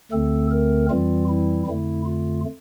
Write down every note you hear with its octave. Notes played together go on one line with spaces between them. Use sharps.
D2 D3 A3 C4 A4
A#4
F2 E3 G3 C4 F4
E4
F2 D3 A3 E4
F4